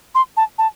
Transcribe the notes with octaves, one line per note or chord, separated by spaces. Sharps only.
C6
A5
A5